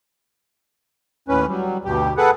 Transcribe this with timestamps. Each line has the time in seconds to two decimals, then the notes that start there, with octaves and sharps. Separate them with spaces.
1.28 D#2 A2 C#4 B4
1.48 F#3 G3
1.85 D2 G2 B2 G4
2.17 G#4 A4 B4 F#5